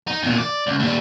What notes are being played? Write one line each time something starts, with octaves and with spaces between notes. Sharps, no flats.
D#4
E2 A#2
D5
C#2
D#2 G3